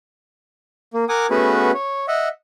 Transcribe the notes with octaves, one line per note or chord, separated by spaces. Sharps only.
A#3
A#4 F#5 G#5 D6 D#6
A3 B3 C#4 F#4 G#4 B4
C#5
D#5 E5 F#5